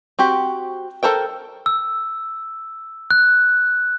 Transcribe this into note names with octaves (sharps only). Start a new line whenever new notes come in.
C4 F#4 G4
A4 A#4 C5 G5
E6
F#6